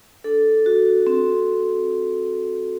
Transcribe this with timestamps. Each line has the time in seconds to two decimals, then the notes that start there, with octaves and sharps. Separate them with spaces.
0.24 D4 A4
0.66 F#4
1.07 C4